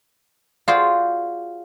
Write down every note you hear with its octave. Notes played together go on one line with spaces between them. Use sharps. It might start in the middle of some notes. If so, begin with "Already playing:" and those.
F4 F#4 G#4 C5 D5